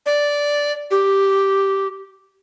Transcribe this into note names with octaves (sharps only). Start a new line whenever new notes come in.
D5
G4